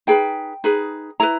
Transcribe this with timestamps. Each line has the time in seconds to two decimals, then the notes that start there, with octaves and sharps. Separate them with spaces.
0.07 D#4 G#4 B4 G5
0.64 D#4 G#4 B4
1.20 E4 G#4 B4 A#5